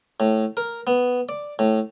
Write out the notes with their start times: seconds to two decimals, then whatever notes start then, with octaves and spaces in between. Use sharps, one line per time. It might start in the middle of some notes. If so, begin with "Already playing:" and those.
0.20 A2
0.57 A#4
0.87 B3
1.29 D5
1.59 A2